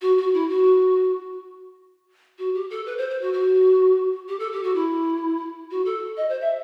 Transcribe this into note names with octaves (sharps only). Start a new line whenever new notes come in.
F#4
F#4
E4
F#4
F#4
G4
A4
B4
C5
C5
F#4
F#4
G4
A4
G4
F#4
E4
F#4
A4
D#5
C5
E5